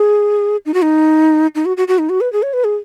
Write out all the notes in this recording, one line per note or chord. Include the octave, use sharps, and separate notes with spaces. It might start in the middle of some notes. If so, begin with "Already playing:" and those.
Already playing: G#4
D#4
F#4
D#4
D#4
F#4
F#4
F#4
D#4
F#4
B4
G#4
C#5
B4
G#4